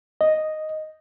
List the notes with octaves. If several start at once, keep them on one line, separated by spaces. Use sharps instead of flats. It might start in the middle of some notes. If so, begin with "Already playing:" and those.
D#5